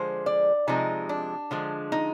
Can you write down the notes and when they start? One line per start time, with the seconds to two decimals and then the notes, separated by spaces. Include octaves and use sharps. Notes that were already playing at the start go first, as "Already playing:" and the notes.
Already playing: D3 F3 G#3 C5
0.26 D5
0.68 C3 F3 G#3 D#4
1.09 D4
1.51 D3 F3 G#3
1.92 D#4